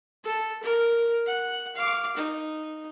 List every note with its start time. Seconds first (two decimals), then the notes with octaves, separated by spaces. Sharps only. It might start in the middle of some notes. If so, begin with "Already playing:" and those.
0.24 A4
0.63 A#4
1.26 F#5
1.76 F5 D6
2.16 D#4